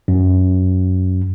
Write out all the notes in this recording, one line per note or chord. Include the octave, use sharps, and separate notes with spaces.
F#2